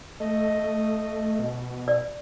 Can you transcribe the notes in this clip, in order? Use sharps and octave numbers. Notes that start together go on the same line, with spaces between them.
A3 D#5
B2
D5